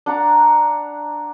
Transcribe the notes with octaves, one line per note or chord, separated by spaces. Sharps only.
D4 F#5 A#5 D6